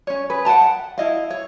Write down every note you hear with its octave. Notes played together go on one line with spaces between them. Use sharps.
C#4 C#5
G#4 B4
F#5 G5 A5 A#5
F#5
E4 D#5 F5
C#5